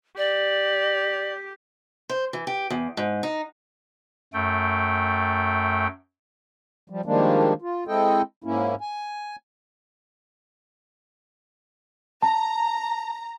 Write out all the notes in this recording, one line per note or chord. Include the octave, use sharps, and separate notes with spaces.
G4 D5
C5
E3
G4
E2
G#2
D#4
F#2 A3 G5
F3 G3
D#3 F3 G3 G#3 A#3 D4
F4
G#3 C4 E4 A4 D#5 G5
G#2 A#3 C#4 E4
G#5
A5 A#5